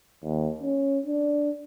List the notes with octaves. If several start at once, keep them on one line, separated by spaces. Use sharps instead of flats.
D#2
C#4
D4